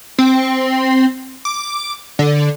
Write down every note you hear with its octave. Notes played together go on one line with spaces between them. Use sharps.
C4
D6
D3